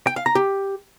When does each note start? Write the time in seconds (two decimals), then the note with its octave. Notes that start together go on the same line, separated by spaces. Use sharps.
0.07 G5
0.16 F5
0.26 A#5
0.35 G4